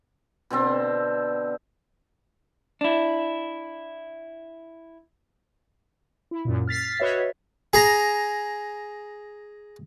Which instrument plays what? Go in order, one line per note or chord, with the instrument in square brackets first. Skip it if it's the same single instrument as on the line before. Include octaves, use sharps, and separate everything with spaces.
[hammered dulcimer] B2 D3 C4 A4
[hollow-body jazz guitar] D4 E4
[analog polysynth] E4
F#2 A#2
F6 A6 B6 C7
F#4 B4 C#5 D#5 E5
[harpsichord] G#4 A#5